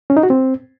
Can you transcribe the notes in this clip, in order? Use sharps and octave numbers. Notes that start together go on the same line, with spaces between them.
C#4
D#4
F#4
C4